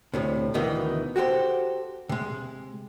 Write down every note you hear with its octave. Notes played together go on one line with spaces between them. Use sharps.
D2 A2 C3
D2 B2 D#3 E3
F#4 G4 A4 C5
C3 G#3